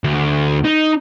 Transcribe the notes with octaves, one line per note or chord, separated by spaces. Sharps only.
D2
D#4